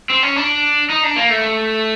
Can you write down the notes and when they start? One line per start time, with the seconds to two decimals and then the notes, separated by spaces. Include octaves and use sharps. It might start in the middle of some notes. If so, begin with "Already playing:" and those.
0.10 C4
0.23 C#4
0.36 D4
0.90 D#4
1.03 D4
1.16 A#3
1.30 A3